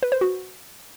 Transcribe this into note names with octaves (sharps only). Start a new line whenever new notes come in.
B4
C5
F#4